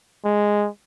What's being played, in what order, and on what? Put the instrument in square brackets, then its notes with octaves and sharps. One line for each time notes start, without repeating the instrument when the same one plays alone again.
[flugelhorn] G#3